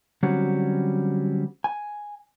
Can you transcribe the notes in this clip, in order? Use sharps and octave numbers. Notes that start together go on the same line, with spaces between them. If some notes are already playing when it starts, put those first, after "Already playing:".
D3 F#3 G3 C4 C#4 F#4
G#5